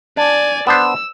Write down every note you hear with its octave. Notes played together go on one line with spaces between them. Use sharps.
D4 D5 G#5
B3 D4 C5 E6